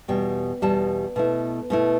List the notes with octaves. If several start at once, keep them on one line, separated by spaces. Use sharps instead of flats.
E2 B2 G3 G5
E2 B2 G3 A5
B2 A3 E4
B2 A3 E4